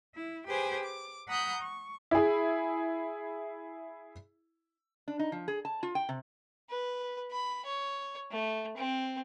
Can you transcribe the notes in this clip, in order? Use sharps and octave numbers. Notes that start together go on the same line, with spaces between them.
E4
G4 G#4 B4 C5 G#5
D6
F#5 A#5 B5 D#6 F#6 G6
C#6
E4 G#4
D4
D#4
F3
G#4
A5
F4
G5
C3
B4
B5
C#5
A3
C4